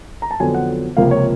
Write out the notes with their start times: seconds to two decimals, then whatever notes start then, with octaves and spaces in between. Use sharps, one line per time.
0.22 A#5
0.31 A5
0.40 F2 D3 F#3 B3 G#5
0.54 F#5
0.97 C#2 C3 F3 A#3 F5
1.11 C#5